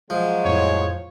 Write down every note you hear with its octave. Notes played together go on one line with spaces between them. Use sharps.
F3 F#3 G#3
F2 A2 C#5